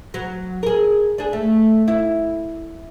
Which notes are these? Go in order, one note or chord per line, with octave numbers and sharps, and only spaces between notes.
F#3
G#4 A#4
D4 G#4
A3
E4